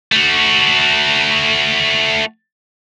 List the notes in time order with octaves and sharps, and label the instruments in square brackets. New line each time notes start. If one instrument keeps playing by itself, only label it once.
[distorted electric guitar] A3 F#4